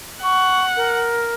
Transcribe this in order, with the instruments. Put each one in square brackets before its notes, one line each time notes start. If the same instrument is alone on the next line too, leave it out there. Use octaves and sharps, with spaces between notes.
[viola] F#5 [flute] C#6
[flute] A#4